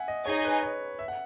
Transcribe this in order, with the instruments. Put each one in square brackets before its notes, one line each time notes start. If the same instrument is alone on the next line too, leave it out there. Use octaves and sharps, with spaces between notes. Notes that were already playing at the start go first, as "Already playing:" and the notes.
Already playing: [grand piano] E5 F#5 G#5
D#5
[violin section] D#4 G#4 D#5 G#5 [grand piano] C#5
[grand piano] B4
C#5
E5
F#5